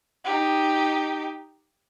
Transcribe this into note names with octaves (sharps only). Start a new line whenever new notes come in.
D#4 G4